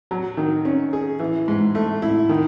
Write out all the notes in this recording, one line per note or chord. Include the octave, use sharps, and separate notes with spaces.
F#3
D#3
C#4
G#4
E3
G#2
A3
E4
D#3